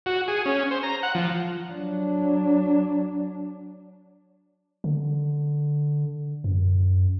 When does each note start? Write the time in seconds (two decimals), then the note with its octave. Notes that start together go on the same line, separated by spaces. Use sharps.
0.06 F#4
0.28 G#4
0.46 C#4
0.71 C5
0.83 A#5
1.03 F#5
1.15 F3
1.73 F#3 D4
4.84 D3
6.44 F#2